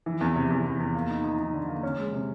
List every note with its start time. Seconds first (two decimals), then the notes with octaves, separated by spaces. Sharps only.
0.06 E3
0.21 E2
0.36 C3
0.50 E2
0.65 E2
0.80 E2
0.95 A#3
1.09 D#4
1.24 D#4
1.38 D#4
1.54 D3
1.68 A#3
1.83 C#4
1.98 G#3
2.13 C3